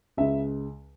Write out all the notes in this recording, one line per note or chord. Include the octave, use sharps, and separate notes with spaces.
C#2 C#3 G#3 E5